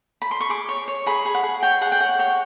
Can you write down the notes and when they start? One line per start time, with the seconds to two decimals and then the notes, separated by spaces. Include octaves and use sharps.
0.22 B5
0.31 C6
0.40 C#6
0.50 G#4 D6
0.69 C#5 C#6
0.88 C#5
1.06 G#4 B5
1.25 G#4
1.35 F#5
1.43 G#4
1.63 C#5 G5
1.81 G#4 F#5
1.92 G5
2.00 C#5 F#5
2.19 C#5 G5